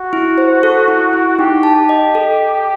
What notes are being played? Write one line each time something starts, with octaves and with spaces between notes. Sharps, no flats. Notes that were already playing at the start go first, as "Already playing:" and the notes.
Already playing: F#4
E4
C5
A4
E4
E4
D#4 G4
A5
G4
D#5
A4